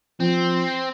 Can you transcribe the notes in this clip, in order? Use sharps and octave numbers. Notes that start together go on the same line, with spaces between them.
F3 C4